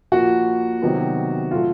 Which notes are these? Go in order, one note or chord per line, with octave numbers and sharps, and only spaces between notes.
A#2 F3 A#3 F#4
C3 D#3 F#3 B3
A#2 F#3 A3 F4